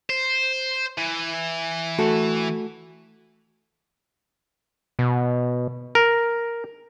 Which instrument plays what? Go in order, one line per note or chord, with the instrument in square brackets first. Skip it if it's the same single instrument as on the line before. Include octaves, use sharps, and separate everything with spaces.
[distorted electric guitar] C5
E3
[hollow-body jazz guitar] A3 F#4 A4
[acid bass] B2
[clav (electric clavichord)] A#4